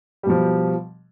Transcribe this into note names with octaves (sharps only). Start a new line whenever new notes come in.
B2 F3 G3